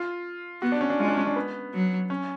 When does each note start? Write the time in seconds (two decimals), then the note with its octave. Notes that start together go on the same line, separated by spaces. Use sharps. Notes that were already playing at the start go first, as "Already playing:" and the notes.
Already playing: F4
0.62 B3 F#4
0.72 D4
0.81 C#4
0.90 D4
0.99 G#3 F4
1.08 D4
1.17 C#4
1.27 D4
1.36 B3
1.73 F#3
2.10 C#4